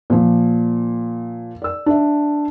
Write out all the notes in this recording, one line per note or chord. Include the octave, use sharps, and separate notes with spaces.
A#2 F3
D5 E6
D4 E5